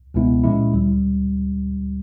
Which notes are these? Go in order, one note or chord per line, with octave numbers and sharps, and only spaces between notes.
C#2 B2 G#3 B3 E4
A#2 F3 G#3 C#4 E4
D2 D3 G3